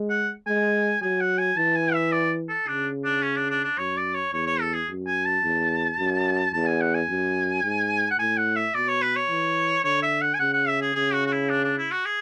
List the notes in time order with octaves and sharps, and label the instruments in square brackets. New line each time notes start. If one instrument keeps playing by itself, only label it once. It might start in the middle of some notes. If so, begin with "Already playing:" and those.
Already playing: [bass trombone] G#3
[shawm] F#5
[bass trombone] G#3 [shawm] G#5
[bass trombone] F#3 [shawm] G#5
[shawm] F#5
G#5
[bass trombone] E3 [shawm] A5
[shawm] G#5
E5
D5
A4
[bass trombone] C#3 [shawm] D4
[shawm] D4
C#4
D4
D4
D4
[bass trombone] F#2 [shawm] C#5
[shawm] D5
C#5
[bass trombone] E2 [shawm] C#5
[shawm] C#5
A4
G#4
[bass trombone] F#2
[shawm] G#5
A5
[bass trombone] E2
F#2
[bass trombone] E2 [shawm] A5
[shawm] G#5
F#5
G#5
[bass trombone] F#2
G#2
[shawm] F#5
[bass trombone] A2 [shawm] G#5
[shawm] F#5
E5
[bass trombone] B2 [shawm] D5
[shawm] C#5
B4
C#5
[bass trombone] E3
[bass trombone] D3 [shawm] C#5
[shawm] E5
F#5
G#5
[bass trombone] C#3 [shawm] F#5
[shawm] F#5
E5
G#4
[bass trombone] C#3 [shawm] G#4
[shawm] F#4
F#4
E4
D4
D4
E4
F#4
G#4